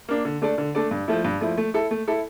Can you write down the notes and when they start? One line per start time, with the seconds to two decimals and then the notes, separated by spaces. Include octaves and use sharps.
0.09 A#3 D4
0.25 D3
0.42 A3 D4 A4 D5
0.58 D3
0.75 A3 D4 A4 D5
0.91 G2
1.08 F3 A3 E4
1.24 G2
1.41 F3 A3 E4
1.58 A3
1.74 E4 A4
1.91 A3
2.08 E4 A4